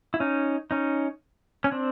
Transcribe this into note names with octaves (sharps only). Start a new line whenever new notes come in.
E4
C#4 D#4
C#4 D#4
C#4
C4 D4